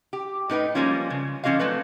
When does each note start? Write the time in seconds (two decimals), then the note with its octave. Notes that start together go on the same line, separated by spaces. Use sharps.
0.13 G4
0.50 A2 D#4 B4 G5
0.75 F3 G3 G#3 A#3 C#4 F4
1.10 C#3
1.44 D3 F3 C#4 F#4 D#5 F5
1.59 F#3 A3 C4 B4